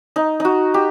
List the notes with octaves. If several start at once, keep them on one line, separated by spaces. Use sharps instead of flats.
D#4
D#4 F#4
G4